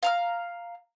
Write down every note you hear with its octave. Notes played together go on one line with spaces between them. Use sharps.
F5 A#5 F6